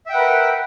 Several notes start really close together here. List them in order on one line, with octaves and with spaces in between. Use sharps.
E5 G5 F#5 B4 A#4